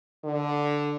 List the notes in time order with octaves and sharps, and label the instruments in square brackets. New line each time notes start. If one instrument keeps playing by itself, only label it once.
[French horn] D3